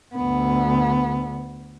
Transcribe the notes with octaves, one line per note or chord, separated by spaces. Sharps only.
D2 B3